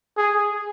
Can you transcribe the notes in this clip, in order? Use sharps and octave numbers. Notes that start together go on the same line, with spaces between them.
G#4